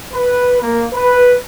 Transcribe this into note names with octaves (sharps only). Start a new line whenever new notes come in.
B4
A#3
B4